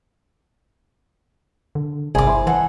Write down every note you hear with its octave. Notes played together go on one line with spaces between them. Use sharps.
D3
G1 C2 G#4 D6
E4 C5
E3 G#4 A4 F#5